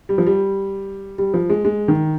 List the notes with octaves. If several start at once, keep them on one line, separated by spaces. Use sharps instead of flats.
G3
F3
G3
G3
F3
G#3
G#3
D#3